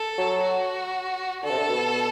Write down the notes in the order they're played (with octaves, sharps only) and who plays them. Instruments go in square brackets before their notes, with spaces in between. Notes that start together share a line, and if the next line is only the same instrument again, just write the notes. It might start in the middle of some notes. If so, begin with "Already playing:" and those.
Already playing: [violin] A4
[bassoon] F#3
[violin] F#4
[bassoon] D3 [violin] A4
[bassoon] C3
D3
B2